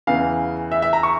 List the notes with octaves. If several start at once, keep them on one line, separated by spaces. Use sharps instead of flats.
E2 C#3 E3 F5
E5
E5
A#5
C#6